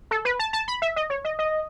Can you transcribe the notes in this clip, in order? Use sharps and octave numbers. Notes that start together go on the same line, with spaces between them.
A4
B4
A5
A5
B5
E5
D#5
C#5
D#5
D#5